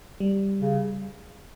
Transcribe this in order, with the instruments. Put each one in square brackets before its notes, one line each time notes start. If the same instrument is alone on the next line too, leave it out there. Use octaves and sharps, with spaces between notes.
[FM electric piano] G3
[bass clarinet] C#3